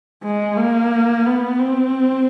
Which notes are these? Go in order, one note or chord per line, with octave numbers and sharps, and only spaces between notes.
G#3
A#3
B3
C4